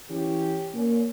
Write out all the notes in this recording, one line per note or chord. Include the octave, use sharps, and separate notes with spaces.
E3 C#4 G4
A#2 A#3 C#4